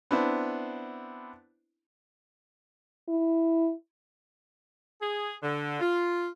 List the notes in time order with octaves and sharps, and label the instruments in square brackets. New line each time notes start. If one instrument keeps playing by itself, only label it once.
[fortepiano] B3 C4 D4 E4
[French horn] E4
[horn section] G#4
D3
F4